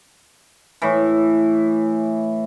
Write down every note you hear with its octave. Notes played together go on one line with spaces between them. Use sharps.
A2 E3